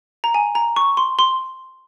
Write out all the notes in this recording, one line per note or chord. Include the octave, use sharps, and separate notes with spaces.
A#5
G#5
A#5
C#6
C6
C6